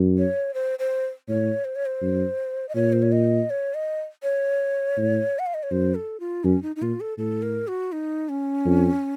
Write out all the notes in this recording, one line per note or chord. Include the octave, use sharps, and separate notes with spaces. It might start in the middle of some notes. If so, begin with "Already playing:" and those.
Already playing: F#2
C#5
C5
C5
A2 C#5
C5
C#5
C5
F#2
D#5
A#2 C#5
C5
C#5
D#5
C#5
D#5
C#5
A2
F#5
F5
D#5
C#5
F#2 C5
A4
F4
F#2 C#4
D#4
D#4
A#2 F4
A4
A2 A4
A#4
F#4
D#4
C#4
F2